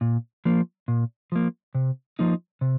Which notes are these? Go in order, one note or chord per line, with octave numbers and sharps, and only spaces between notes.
A#2
F3 A#3
A#2
F3 A#3
C3
F3 A#3 D#4
C3